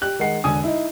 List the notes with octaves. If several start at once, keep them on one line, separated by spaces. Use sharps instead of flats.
G4 F#6
D#3 G#3 F#5 C7
E1 D3 G#5 D#6
D#4 E4